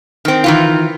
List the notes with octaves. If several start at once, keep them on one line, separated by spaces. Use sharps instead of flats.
D#3 C4
D#3 E3 F4